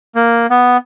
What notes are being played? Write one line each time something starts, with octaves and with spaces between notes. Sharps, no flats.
A#3
B3